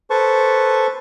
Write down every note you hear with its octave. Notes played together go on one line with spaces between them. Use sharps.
A4 B4 C5 A5 C#6